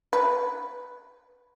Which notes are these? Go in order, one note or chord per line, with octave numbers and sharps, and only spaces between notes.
B4